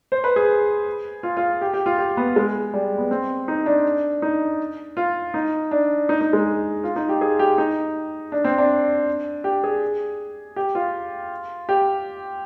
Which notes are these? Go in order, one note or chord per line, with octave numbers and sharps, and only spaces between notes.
C5
B4
G#4
F4
F4
G4
G4
F4
G4
B3
G#3
G3
B3
C4
D#4
D4
D#4
F4
D#4
D4
D#4
D#4
G#3
F4
D#4
G4
G#4
G4
D#4
D4
C4
D4
G4
G#4
G4
F4
G4